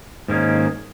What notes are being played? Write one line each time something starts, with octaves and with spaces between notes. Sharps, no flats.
G#2 D#3 A#3 C#4